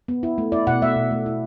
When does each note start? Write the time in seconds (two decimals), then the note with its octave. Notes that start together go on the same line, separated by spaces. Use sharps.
0.08 B3
0.23 E4
0.38 A3
0.52 E4 D5
0.67 B2 F#5
0.82 A3 E5
0.96 B2
1.11 A3
1.26 E4